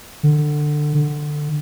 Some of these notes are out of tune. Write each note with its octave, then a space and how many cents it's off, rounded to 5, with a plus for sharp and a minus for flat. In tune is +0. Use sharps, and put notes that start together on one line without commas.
D3 +20
D3 +15